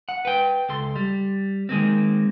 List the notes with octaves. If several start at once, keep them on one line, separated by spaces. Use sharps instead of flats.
F#5
B4 G5
C#2 A4 C6
G3
D#3 G#3 A#3 C4